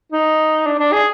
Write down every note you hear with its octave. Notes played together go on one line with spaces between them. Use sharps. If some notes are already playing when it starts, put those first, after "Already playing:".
D#4
D4
D4
G#4